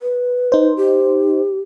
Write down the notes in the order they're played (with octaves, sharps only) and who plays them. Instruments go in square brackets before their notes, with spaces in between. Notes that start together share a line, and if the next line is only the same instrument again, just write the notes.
[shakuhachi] B4
[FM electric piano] D#4 C5
[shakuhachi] G4